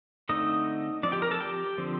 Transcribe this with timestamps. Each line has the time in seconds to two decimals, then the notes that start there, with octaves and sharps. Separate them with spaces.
0.29 D3 A3 C4 D#4 D#5
1.03 F3 D4 D5
1.07 C4
1.12 G4 G5
1.22 A#4 A#5
1.31 A4 A5
1.41 G4 G5
1.78 D3 F3 C4